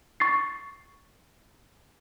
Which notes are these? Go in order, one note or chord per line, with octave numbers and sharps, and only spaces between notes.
C#6 A6 C7